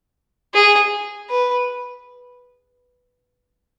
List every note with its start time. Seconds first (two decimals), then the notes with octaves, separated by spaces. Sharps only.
0.54 G#4
1.30 B4